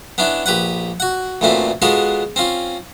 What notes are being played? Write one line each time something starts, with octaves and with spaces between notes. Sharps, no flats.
B3 C#4 D4 E4
A#1 G4 B4 F#5
F#4 F#5
D2 A#2 E3 A3 C4 C#4
G#3 B3 F4 F#4 A4
C4 C#4 F4